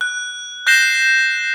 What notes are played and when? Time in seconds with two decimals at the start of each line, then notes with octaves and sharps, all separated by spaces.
0.01 F#6
0.67 F#6 G6 A#6 C7 E7 G7